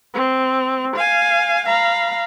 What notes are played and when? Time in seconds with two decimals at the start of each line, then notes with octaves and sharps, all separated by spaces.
0.14 C4
0.96 F5 G#5
1.66 F5 A#5 B5